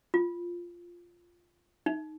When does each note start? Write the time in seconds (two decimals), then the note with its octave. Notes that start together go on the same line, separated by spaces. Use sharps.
0.14 F4
1.86 D#4